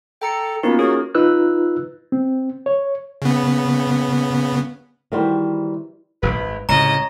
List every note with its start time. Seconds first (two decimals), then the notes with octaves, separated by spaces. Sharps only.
0.22 A4 G5 A#5 C#7
0.63 A#3 B3 C#4 D#4 F4 F#4
0.79 F#4 G#4 A#4 C#5
1.15 D#4 F4 B4 E6 F#6
2.12 C4
2.66 C#5
3.22 C#3 B3
5.12 D#3 E3 G3 F#4 B4 C5
6.23 D#1 G#1 B4
6.69 C#2 A2 C3 C#5 D#5 A#5